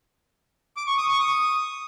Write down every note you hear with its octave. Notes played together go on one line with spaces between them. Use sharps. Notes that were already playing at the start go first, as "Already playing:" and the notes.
D6
C#6
D#6
C#6
D#6